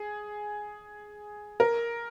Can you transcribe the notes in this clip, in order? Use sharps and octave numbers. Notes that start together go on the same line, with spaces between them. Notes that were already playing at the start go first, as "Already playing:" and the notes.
Already playing: G#4
A#4